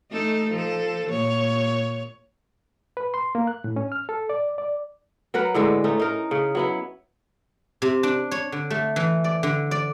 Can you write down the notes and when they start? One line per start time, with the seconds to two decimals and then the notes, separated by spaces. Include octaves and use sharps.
0.12 A3 D#4 A4
0.51 F3 A4
1.10 A#2 C#5
2.97 B4
3.14 C6
3.35 A#3
3.47 F#6
3.64 A2
3.76 C#4
3.92 F6
4.09 A4
4.29 D5
4.58 D5
5.34 F#3 A#4 B4 F#5
5.54 A2 D3 G#3
5.84 A3 C#4 D#4
6.00 D#4 A#4
6.31 C#3
6.55 F#3 B3 E4
7.82 C3
8.03 D4
8.31 C#5
8.52 D3
8.70 A3
8.96 E3
9.24 D5
9.43 D3
9.71 D5